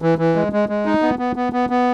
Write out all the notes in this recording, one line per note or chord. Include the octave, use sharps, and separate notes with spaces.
E3
E3
G#3
G#3
G#3
D#4
B3
B3
B3
B3
B3